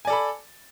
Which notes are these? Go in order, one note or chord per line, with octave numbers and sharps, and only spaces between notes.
A4 D5 G#5 B5